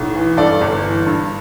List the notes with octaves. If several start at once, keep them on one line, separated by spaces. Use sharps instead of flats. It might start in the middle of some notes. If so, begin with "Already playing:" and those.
Already playing: B1 A2 E3
E3
G2 A4 D5
G1
E3
G2